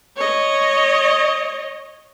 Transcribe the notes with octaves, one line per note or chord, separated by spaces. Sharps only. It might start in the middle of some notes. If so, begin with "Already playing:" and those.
C#5 D#5